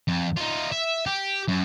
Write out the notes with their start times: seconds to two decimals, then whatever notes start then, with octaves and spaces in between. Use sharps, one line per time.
0.08 F2
0.37 D#4 F4
0.72 E5
1.06 G4
1.48 F#2